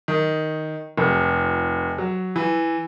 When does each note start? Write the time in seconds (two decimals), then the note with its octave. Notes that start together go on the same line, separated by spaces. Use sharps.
0.08 D#3
0.98 F1
1.98 F#3
2.36 E3